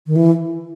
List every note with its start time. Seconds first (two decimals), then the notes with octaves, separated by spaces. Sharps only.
0.07 D#3
0.16 E3